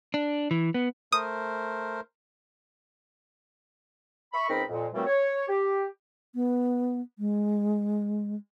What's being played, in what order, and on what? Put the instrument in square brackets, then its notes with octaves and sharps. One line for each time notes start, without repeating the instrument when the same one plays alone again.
[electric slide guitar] D4
E3
B3
[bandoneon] A3 A#4 C5 [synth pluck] D#6
[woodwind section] E5 B5 C#6
C#2 C4 D#4 A#4 B5
F2 A#2
A#2 E3 F#3 G3 A3 C4
C#5
G4
[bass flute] B3
G#3